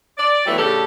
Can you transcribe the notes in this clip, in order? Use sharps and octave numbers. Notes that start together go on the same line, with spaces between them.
D5
E3 F#3 G3 A3 B3 E4
A2 C#3 D4 G4 A4